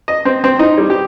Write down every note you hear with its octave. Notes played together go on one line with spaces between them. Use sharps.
D#5
C4
C4
D#4
G3
G4